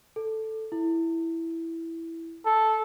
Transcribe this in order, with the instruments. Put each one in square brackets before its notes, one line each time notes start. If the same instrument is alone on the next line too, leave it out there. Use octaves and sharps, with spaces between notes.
[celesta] A4
E4
[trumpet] A4